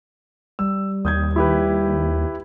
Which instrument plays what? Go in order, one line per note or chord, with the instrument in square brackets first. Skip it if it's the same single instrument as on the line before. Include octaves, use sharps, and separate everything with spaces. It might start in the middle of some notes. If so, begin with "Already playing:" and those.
[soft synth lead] G3 [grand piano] E6
[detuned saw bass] D#2 [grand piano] D#6 G6 G#6
[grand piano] E4 G4 B4